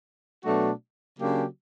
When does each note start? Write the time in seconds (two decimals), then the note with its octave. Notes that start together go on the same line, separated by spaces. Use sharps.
0.45 B2 F#3 A3 D4 F#4
1.19 C#3 F#3 A#3 D4 G4